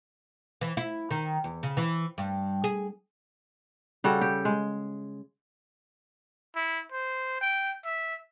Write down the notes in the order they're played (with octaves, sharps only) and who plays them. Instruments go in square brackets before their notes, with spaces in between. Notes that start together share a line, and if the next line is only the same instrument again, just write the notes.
[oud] E3
E4
D#3
E2
C#3
E3
G2
G#4
[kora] C#3 G3 F#4 A4
G4
G#3
[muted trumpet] E4
C5
G5
E5